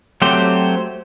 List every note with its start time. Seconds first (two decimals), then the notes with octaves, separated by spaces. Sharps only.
0.22 F#3 A3 C4 G4 C5